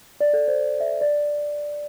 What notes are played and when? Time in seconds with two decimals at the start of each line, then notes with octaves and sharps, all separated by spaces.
0.21 D5
0.34 A4
0.48 C5
0.80 E5
1.01 D5